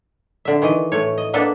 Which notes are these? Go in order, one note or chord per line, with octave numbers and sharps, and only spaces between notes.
D3 E5
D#3 E3 D#5
A2 A3 C#5
D#5
A#3 B3 D4 A4 B4